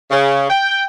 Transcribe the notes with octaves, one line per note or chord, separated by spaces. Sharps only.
C#3
G5